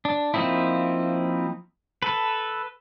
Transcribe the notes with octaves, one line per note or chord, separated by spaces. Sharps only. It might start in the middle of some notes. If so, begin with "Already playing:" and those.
D4
F3 A#3 C4 D#4 E4
A4 B4